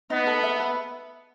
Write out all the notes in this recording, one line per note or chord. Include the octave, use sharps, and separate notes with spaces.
B3 D#4
A4
E5
B4